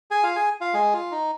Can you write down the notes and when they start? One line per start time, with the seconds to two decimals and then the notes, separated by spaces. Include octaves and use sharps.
0.11 G#4 G#5
0.23 F4 F5
0.36 G#4 G#5
0.61 F4 F5
0.74 G#3 G#4
0.93 F4
1.11 D#4